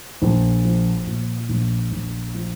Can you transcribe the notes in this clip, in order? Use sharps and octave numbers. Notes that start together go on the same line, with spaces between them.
A#1
F3
A#2
A#1
A#1
F3